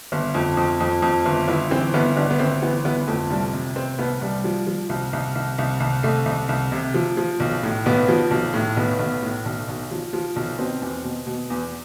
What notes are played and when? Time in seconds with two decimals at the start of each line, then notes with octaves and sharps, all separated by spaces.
0.12 G1
0.35 F2
0.57 F2
0.80 F2
1.02 F2
1.26 G1
1.48 G1 E4
1.71 E3 C4
1.94 G1 B3
2.17 G1 D4
2.30 B3
2.39 G1 C4
2.62 E3 B3
2.85 G1 B3
3.07 F2 A3
3.30 C2 G3
3.53 C3
3.75 C3 C4
3.99 C2 B3
4.21 C2 G3
4.44 F3
4.67 F3
4.89 C2
5.13 C2
5.35 C2
5.58 C2
5.80 C2
6.03 C2 A3
6.26 C2
6.49 C2
6.72 C3
6.94 F3
7.17 F3
7.40 B1
7.63 A2
7.86 B1 B3
8.08 F3
8.31 B1
8.53 A2
8.77 B1 B3
8.99 B1
9.22 A2
9.46 B1
9.68 B1
9.91 F3
10.13 F3
10.36 B1
10.59 B2 C4
10.82 E2
11.04 B2
11.27 B2
11.50 E2